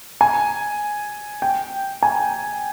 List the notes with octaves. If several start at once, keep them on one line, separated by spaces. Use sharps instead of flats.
G#5
G5
G#5